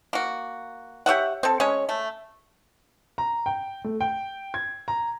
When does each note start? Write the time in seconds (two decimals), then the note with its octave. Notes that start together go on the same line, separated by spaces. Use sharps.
0.13 A#3 F#4
1.06 G4 C#5 E5 F#5
1.43 C4 A4
1.60 G#3 C#4 C#5
1.89 A3
3.18 A#5
3.46 G5
3.84 A3
4.01 G5
4.54 G#6
4.88 A#5